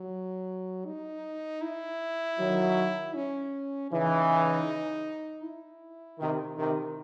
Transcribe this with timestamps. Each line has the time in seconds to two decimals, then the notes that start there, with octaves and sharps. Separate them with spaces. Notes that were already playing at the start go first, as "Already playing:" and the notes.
Already playing: F#3
0.86 D#4
1.62 E4
2.38 D#3 F#3
3.15 C#4
3.91 C#3 E3 D#4
5.43 E4
6.19 C3 D#3
6.58 C3 D#3